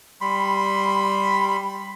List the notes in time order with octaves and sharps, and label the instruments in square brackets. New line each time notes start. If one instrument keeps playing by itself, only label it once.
[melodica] G3 B5 C6